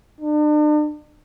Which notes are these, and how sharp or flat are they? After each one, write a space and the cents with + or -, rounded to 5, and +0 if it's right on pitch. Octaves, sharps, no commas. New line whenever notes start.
D4 +40